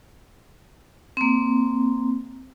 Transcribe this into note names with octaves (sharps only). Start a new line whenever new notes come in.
A#3 C4